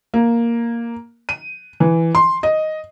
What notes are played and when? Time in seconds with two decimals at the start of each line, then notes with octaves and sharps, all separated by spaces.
0.14 A#3
1.29 D#7
1.80 E3
2.15 C6
2.43 D#5